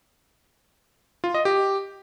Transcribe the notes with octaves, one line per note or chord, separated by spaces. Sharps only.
F4
D#5
G4